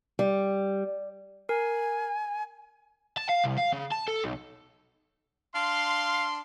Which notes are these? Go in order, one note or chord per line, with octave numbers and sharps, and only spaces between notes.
G3
A#4 G#5
A5
F5
C2
F5
C#3
A5
A4
B1
D4 F5 C6